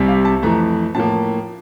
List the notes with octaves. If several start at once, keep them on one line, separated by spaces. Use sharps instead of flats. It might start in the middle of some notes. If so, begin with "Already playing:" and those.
Already playing: C2 C3 G3
F5
A5
F2 E3 A3 A#5
A2 F3 A#3 A5